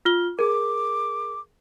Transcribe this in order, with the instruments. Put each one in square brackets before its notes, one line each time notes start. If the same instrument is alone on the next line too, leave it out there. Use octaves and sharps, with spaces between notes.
[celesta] F4 F6 G7
[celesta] G#4 A#4 [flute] D6